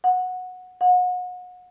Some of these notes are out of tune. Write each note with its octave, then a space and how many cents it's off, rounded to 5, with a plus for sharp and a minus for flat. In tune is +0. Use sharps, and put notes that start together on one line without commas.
F#5 -15
F#5 -35